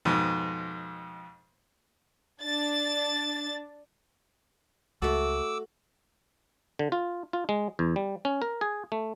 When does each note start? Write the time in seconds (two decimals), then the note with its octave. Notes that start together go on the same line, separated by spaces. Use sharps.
0.05 F2 G#2 B2
2.42 D4 A6
5.02 C#2 A3 F#4 A4 D6 E6
6.79 D3
6.92 F4
7.33 F4
7.49 G#3
7.79 E2
7.96 G3
8.25 C#4
8.42 A#4
8.61 G#4
8.92 A3